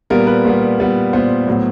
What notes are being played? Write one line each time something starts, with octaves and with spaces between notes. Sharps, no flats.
A#2 G3 B3 A#4
B4
A#2 G3 B3
A#2 G3 B3
A#2 G3 B3 C5
A2 F#3 B3